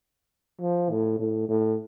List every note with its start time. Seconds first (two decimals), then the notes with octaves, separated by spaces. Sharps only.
0.61 F3
0.90 A2
1.19 A2
1.49 A2